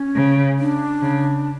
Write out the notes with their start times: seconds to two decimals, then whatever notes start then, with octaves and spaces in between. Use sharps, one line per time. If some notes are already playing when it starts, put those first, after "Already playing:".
Already playing: C#4
0.16 C#3
0.59 D4
1.02 C#3